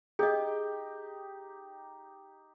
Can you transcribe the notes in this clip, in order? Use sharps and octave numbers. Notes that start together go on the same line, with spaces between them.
D#4 G4 G#4 D#5